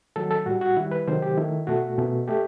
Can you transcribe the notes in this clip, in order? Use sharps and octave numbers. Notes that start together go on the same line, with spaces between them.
D#3 F#3 A3 A4
A4
A2 G3 F#4
F#4
D#3 G3 E4
B4
C3 D#3 F#3 A3 C5
G4
D#3 A3 E4
B2 A3 F#4
B2 A3
A3 G4